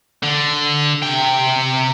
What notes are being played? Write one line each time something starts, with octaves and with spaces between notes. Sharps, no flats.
D3
C3 G5